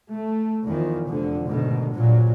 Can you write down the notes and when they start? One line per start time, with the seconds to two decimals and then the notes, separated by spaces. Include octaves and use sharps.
0.11 A3
0.66 E2 D#3 F3
1.08 F1 F2 D3
1.49 A1 G#2 B2 D3 D#3
1.94 A#1 G2 A#2 F#3